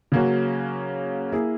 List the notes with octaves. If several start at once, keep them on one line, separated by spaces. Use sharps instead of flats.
C#3 F#3 A#3 C#4 F#4
A#3 E4 G#4